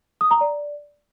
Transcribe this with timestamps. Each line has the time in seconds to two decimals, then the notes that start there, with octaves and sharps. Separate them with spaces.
0.21 D#6
0.31 A#5
0.41 D5